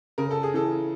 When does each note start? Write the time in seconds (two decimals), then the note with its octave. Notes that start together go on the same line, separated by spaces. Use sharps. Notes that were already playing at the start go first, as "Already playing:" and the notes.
0.18 C#3 A#4
0.31 A4
0.43 G#4
0.54 E3 A4